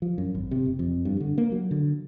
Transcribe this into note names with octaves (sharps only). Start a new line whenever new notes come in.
F3
F#2
G#1
C3
F#1
F2
G2
D3
A#3
F#3
D3